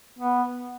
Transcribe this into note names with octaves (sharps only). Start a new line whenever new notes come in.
B3